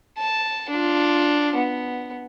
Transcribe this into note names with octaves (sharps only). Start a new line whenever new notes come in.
A5
D4 F4
B3